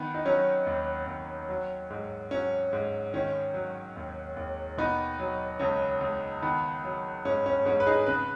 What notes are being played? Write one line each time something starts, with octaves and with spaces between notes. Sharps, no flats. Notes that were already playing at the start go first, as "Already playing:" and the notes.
Already playing: D#3 B3
D#4
F#3 C#4
D#2
D#2
F#3
G#2
F#3 C#4
G#2
D#3 C#4
F#3
D#2
D#2
B2 B3 D#4
F#3
C#2 C#4
C#2
D#3 B3
F#3
G#2 C#4
C#4
G#2 C#4
B4
D#4 G#4
C#3 B4